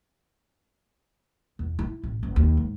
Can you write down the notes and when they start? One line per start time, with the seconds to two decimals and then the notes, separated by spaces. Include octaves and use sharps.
1.59 E2
1.79 E4
2.03 A1
2.23 F#1
2.36 D#2
2.57 G#2